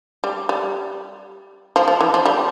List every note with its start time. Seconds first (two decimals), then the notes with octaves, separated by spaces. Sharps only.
0.24 G3
0.49 G3
1.76 F3
1.88 F3
2.01 E3
2.14 F3
2.26 G3